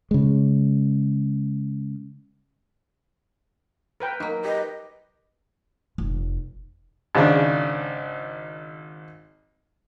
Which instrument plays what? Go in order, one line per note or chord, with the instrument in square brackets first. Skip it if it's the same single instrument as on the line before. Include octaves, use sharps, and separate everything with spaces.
[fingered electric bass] C#3 G#3
[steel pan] A#4 B4 G5
[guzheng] F#3 A#3 [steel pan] D#4
[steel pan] G4 B4 [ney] D#5
[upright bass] F1
[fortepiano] G#1 C#3 D4